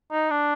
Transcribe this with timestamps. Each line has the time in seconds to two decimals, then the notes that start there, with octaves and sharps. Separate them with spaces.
0.12 D#4
0.31 D4